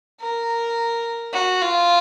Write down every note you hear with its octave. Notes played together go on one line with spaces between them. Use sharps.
A#4
F#4
F4